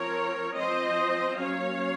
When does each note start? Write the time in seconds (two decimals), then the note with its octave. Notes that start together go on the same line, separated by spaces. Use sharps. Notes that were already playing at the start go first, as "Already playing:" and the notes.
Already playing: F3 C4 A#4 C#5
0.56 F3 C4 C5 D#5
1.38 F#3 A#3 C#4 C#5 F5